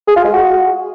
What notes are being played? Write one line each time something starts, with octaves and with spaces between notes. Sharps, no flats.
G#4
F4
G#3
F#4